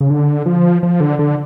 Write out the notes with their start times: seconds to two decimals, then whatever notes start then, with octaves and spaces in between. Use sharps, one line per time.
0.01 C#3
0.10 D3
0.46 F3
0.83 F3
1.00 D3
1.19 D3